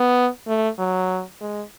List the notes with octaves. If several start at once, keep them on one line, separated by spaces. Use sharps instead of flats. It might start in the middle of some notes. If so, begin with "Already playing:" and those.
Already playing: B3
A3
F#3
G#3